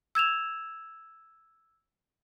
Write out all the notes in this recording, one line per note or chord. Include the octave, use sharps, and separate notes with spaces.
E6 G#6 E7 F7